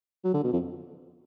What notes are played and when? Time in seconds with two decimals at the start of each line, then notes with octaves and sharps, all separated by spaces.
0.24 F#3
0.34 D3
0.44 B2
0.53 F2